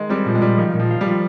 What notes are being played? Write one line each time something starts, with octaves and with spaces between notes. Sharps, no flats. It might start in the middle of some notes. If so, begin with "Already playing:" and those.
Already playing: D#3 G#3
G3 C4
A#2 F3
G#3
A#2 G3
D#3 F3
A#2
F3
F4
G3
F3